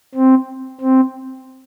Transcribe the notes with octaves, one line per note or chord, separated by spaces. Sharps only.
C4
C4